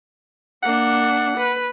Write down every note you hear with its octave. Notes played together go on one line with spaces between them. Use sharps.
A#3 D4 F#5
B4